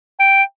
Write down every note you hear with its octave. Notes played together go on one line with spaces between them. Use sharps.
G5